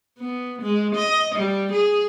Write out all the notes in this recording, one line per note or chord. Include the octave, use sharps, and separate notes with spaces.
B3
G#3
D#5
G3
G#4